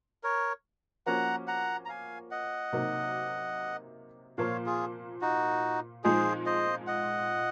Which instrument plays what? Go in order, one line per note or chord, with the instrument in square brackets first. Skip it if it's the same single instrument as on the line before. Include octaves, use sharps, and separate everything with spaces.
[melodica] A#4 C#5
[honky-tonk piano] F3 A#3 C#4 F#4 [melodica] F#5 A#5
[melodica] F#5 A#5
A#5
F5 G#5
D#5 F#5
[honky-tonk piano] C3 F#3 A#3 D#4
[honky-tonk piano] A#2 F3 A#3 [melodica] C#5 F5
[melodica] F4 G#4
D#4 F#4
[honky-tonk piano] A#2 F3 G#3 D#4 [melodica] G#4 C5
[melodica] C5 D#5
D#5 F#5